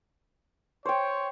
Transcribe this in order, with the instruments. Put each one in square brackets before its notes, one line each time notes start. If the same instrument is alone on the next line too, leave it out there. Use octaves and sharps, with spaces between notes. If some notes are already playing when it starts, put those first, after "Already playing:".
[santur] C5 G5 [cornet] C#5